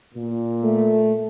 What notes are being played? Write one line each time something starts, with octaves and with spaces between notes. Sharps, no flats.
A#2
A3